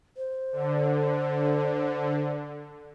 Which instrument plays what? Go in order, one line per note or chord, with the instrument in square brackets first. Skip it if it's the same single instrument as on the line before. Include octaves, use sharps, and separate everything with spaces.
[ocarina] C5
[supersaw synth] D3